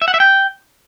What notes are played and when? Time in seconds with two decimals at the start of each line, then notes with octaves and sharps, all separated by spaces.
0.02 E5
0.08 F#5
0.14 E5
0.20 G5